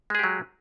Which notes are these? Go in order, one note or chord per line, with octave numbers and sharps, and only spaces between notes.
F#3 G#3 G4 G#4